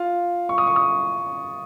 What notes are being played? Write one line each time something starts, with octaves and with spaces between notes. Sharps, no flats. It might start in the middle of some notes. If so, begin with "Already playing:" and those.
Already playing: F4 F5
C#6
D#6
C#6
D#6